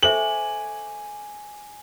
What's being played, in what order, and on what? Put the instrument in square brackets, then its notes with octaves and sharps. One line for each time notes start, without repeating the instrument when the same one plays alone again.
[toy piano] A4 C5 E5 [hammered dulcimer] G#5 C#6 D6 [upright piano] F#7